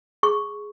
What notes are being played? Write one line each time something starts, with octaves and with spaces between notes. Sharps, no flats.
G#4 C#6